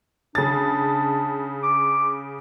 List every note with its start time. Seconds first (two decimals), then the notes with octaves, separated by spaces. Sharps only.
0.35 C#3 D4 A6
1.63 D6